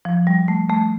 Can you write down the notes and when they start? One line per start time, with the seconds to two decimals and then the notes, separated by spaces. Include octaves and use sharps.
0.05 F3
0.27 G3
0.48 A3
0.69 A3